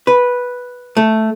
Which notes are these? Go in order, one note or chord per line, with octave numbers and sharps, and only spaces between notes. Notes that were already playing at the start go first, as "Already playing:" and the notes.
B4
A3